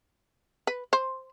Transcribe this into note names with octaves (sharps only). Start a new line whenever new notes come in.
B4
C5